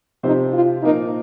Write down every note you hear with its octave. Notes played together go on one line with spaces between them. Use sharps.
C3 F3 C4 D#4 G4 C5
F4
A#2 F3 A#3 D#4